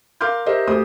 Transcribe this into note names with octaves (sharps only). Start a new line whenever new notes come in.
A#4 F5 C6 D6 F6 G6
G4 A#4 C5 D#5 E5
D2 G4 C5 D#6